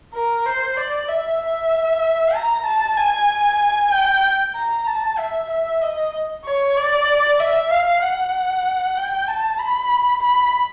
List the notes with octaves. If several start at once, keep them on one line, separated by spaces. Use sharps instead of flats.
A#4
C5
D5
E5
E5
A#5
A5
G#5
G5
A#5
A5
E5
E5
D#5
C#5
D5
E5
F5
F#5
G5
A5
B5
B5